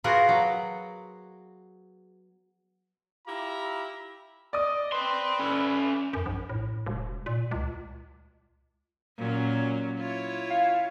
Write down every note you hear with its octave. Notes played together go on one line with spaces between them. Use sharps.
B3 F4 F#4 G#4 A#4
F#3
E4 F4 G4 E5 A#5
D5 D#5 D#6
B4 G5 C6
C#4 A4
F#2
A#1
A2
E1
A#2
C#2
A#2 F#3 C#4
E4 F4 C#5
F5